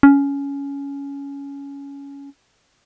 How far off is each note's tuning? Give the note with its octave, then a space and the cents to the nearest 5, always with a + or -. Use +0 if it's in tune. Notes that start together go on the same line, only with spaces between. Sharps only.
C#4 +15